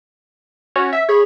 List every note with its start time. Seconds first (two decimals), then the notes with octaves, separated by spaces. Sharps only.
0.76 C#4 F#4 C#5
0.93 E5
1.09 G#4 C#5 B5